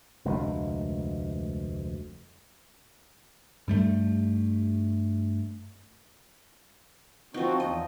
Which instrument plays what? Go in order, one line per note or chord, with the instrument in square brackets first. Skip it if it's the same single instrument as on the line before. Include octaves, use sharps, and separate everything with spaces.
[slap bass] F1 D2 G#3
[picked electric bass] G2 G3 A3
[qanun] F3 D#4 [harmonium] C4 F#4
[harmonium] E2 [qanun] D#5